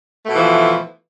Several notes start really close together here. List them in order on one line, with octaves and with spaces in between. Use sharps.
A3 B2 E3 F3